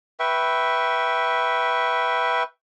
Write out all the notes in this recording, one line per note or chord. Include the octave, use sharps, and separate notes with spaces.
B4 E5 G5 C#6